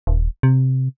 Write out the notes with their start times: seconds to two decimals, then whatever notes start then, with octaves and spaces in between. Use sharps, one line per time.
0.07 D#1
0.43 C3